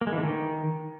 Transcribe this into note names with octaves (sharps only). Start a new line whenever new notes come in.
A#3
G#3
E3
D3
D#3